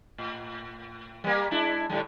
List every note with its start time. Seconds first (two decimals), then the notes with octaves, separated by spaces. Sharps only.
0.18 A2
1.24 G3 A#3
1.51 G#3 D4 E4
1.90 A2 D3 G3